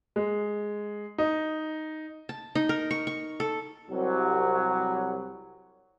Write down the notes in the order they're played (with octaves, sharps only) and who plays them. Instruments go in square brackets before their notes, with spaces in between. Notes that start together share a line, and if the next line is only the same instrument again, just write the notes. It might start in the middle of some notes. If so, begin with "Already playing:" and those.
[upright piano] G#3
D#4
[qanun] A5
D#4
A#4
C#6
C#6
A4
[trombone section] C2 F#3